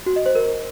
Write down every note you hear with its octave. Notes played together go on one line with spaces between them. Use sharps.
F#4
D#5
C5
A#4